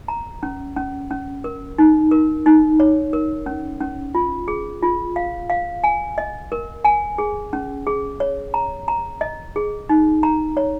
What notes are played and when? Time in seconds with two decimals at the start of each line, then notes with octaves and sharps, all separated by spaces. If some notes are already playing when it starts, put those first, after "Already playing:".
0.08 A#5
0.43 C#4
0.77 C#4
1.11 C#4
1.44 A#4
1.78 D#4
2.11 A#4
2.46 D#4
2.80 C#5
3.13 A#4
3.46 C#4
3.81 C#4
4.15 F4
4.48 G#4
4.83 F4
5.16 F5
5.50 F5
5.84 G#5
6.18 D#5
6.52 A#4
6.85 G#5
7.18 G#4
7.53 C#4
7.87 G#4
8.20 C#5
8.54 A#5
8.88 A#5
9.21 D#5
9.56 G#4
9.89 D#4
10.23 A#5
10.57 C#5